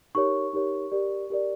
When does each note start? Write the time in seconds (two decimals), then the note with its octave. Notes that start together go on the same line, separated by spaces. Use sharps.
0.15 D#4 G4 A#4 C#5 C#6
0.53 D#4 G4 A#4 C#5
0.92 G4 A#4 D5
1.30 G4 A#4 D5